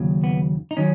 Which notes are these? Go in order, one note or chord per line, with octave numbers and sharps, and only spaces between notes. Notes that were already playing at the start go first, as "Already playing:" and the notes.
Already playing: D#2 C#3 F#3
B3
D#4
D#3 F#3 C#4